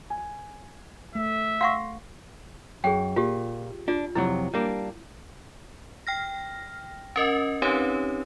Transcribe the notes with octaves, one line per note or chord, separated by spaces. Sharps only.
G#5
A3 E5
F5 F#5 C6 C#6 A#6
F#2 G#4 G5
A#2 F4 G4
D4 F4 D5
F2 C3 F#3 E4
G3 A#3 D4 C#5
G5 F6 A#6
C#4 A#4 D#5
C4 C#4 D#4 G4 B4 C#5